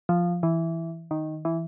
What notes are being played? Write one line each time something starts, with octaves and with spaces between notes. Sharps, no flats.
F3
E3
D#3
E3